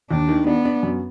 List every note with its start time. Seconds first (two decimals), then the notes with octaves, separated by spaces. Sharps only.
0.10 D#2 D4
0.29 D#3
0.47 B3 D4
0.65 D4
0.83 F#2